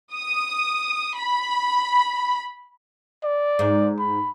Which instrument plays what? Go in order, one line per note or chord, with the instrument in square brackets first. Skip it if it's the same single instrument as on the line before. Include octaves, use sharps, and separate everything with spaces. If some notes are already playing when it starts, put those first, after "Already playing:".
[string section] D#6
B5
[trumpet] D5
[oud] G#2
[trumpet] B5